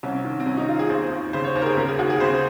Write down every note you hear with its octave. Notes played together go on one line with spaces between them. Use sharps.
C2 C#4
D#3
C4
C2 C#4
D#4
D#3 F4
G#4
D#2 C5
D#2
C#3 C5
C#5
D#2 C5
A#4
G#4
C#3 A#4
G#4
D#2 F#4
G#4
C#3 C5